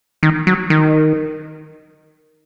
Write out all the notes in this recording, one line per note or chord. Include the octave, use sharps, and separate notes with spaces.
D#3
F#3
D#3